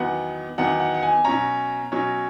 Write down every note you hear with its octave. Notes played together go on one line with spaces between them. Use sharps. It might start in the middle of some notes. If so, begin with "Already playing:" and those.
Already playing: E2 D#3 F#3 B3 F#5
E2 D#3 F#3 B3 F#5
F#5
F#5
G#5
B2 F#3 C#4 A#5
B2 F#3 C#4